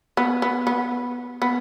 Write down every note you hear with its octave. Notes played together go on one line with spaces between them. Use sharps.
B3
B3
B3
B3